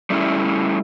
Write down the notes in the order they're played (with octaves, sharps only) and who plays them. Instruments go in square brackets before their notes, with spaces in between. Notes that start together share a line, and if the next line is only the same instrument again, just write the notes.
[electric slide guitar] G3 A3 C#4 E4